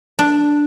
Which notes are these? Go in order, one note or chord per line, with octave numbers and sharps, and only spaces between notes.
D4